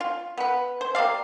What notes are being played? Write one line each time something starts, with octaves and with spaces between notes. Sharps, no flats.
F4
B3 B4
C5
A#3 G4 D5 F5